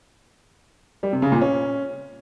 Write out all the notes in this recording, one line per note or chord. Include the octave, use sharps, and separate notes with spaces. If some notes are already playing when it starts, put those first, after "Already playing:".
G3
C3
C#3
A#2
C#4